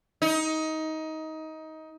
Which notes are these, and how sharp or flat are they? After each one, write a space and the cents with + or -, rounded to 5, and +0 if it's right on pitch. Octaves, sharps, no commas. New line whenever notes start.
D#4 +20